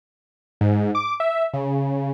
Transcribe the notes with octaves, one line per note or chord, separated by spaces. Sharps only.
G#2
D6
E5
C#3